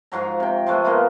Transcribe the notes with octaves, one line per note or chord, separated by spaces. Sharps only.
G#2 F3 F#3 A#5
C3 G5
F3 G#3 A3 C5
A#3 B3 F4 A#4